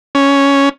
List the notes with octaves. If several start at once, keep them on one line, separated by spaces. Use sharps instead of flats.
C#4